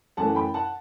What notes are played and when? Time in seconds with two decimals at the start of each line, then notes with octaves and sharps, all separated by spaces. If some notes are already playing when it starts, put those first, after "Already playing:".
0.17 F#2 E3 A3 F#5 A5
0.35 G5 B5
0.54 F#5 A5